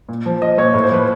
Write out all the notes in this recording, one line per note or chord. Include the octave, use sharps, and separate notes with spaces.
A#2
F3
F3 D#5
A#2 C#5
A2 C#5
C5
F3 B4